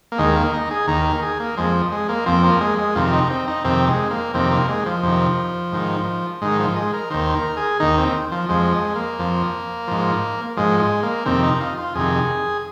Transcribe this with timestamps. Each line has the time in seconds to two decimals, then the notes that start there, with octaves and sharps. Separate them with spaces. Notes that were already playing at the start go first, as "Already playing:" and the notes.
0.12 A#3
0.18 D#2 D#3 G#3
0.36 A#3
0.53 D#4
0.71 G#4
0.87 D#2 D#3 A#4
1.05 A#4
1.23 G#4
1.40 A#3
1.57 F2 F3 G#3
1.92 G#3
2.09 A#3
2.26 F2 F3 C4
2.44 A#3
2.61 G#3
2.79 G#3
2.95 F2 C3 D#3 F4
3.13 D#4
3.30 C4
3.48 D#4
3.64 F2 C3 D#3 C4
3.88 G#3
4.11 A#3
4.34 F2 C3 D#3 C4
4.51 A#3
4.68 G#3
4.86 F3
5.03 F2 C3 D#3
5.72 G#2 D#3
6.42 G#2 D#3 G#3
6.59 F3
6.76 G#3
6.94 A#4
7.10 D#2 D#3 C5
7.34 A#4
7.57 G#4
7.80 D#2 D#3 D#4
7.98 C4
8.32 F3
8.49 F2 F3 G#3
8.72 G#3
8.95 A#3
9.19 F2 F3
9.88 G#2 F3
10.57 G#2 F3 G#3
10.80 G#3
11.03 A#3
11.25 F2 C3 D#3 C4
11.43 D#4
11.61 F4
11.78 F4
11.95 F2 C3 D#3 G#4